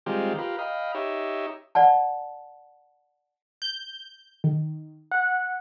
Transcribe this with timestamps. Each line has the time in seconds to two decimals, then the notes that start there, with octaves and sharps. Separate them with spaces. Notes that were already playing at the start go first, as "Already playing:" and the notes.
0.06 D#3 G3 G#3 C4 F4 G4
0.38 F4 G4 A#4 B4
0.59 D#5 F5 G5 B5
0.95 D#4 G4 C#5 E5
1.75 D5 F#5 A5
3.62 G6
4.44 D#3
5.11 F#5